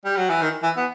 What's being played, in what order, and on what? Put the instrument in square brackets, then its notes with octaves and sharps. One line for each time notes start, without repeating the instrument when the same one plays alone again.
[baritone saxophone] G3
F#3
E3
D#3
E3
B3